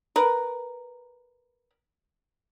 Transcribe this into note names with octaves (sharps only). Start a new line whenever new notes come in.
A#4 B4